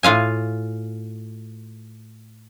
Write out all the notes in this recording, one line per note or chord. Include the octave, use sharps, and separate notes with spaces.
A2 F4 F5 G#5